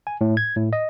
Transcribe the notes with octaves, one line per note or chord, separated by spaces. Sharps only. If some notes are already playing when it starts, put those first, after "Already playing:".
G#5
A2
G#6
A2
D#5